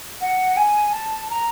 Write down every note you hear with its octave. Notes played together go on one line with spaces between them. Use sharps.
F#5
G#5
A5
A#5